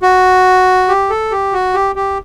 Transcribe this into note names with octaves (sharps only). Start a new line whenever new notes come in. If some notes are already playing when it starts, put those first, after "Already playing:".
F#4
G4
A4
G4
F#4
G4
G4